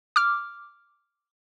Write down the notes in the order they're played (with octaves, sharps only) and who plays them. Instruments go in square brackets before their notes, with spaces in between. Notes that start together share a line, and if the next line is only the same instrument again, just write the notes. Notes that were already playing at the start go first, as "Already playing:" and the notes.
[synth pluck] D6 F6